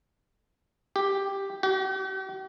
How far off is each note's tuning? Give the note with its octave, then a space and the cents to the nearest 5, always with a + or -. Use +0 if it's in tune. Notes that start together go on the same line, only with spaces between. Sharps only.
G4 +5
G4 -45